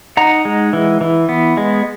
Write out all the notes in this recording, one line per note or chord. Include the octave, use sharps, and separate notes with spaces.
D#4 F#5 A#5
G#3
E3
E3
B3
G#3